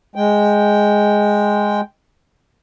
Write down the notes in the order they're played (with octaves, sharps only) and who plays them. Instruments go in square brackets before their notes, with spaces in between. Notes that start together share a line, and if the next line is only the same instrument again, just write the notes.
[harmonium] G#3 G5